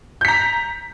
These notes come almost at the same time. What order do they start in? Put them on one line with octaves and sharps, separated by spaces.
G6 B6 A#5